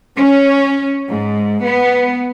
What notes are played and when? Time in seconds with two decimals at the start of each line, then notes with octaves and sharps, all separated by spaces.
0.17 C#4
1.09 G#2
1.64 B3